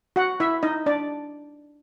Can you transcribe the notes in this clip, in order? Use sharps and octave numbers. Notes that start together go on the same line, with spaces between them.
F#4 F#5
E4 E5
D#4 D#5
D4 D5